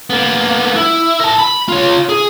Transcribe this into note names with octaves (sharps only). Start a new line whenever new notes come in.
A#3 B3
E4
A#4 A5
B5
F4 C#5
G#4